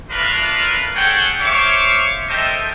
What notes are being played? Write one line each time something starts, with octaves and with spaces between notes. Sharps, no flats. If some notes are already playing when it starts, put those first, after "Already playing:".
A3 D4 F4 A#4 B4
G#4 A4 C#5 F#5 G5
C5 C#5 E5 F5 C#6 D6
A4 A#4 C5 D#5 E5 G5